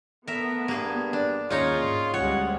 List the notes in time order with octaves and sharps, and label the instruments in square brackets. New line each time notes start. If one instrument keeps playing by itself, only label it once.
[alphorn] A3 [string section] B3 [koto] A#4 E5
[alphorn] G2 [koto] A#3 G#4
[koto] D4
[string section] D#2 [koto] C#4 D#4 C#5 [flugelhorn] F4 [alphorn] G#4
[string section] G#2
[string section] D2 G3 G#3 [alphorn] C#4 [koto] C#5 [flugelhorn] F#5